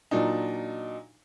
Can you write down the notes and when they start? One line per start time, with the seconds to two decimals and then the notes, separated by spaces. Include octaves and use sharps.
0.11 A#2 F#3 D4 D#4